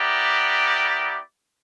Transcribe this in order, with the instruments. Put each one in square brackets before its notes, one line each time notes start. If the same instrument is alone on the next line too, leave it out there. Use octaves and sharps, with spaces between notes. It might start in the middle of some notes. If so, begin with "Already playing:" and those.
Already playing: [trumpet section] B3 E4 G4 A#4 D5